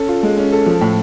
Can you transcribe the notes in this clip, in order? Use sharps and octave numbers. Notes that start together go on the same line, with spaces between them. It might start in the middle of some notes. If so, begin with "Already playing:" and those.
Already playing: C#4 A4
F4
G#3
C#4
A4
F3
A2